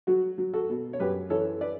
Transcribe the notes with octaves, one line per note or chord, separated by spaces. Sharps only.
F#3 F#4
F#3
F#4 A4
B2
C#5
F#2 G4 B4
E3 A4 C#5
B4 D5